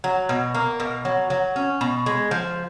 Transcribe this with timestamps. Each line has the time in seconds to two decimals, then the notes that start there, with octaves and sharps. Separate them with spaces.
0.04 F#3
0.29 B2
0.55 A#3
0.80 B2
1.05 F#3
1.30 F#3
1.56 C#4
1.81 B2
2.06 G#3
2.31 F3